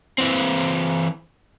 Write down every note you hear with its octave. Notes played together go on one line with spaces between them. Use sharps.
E3 C4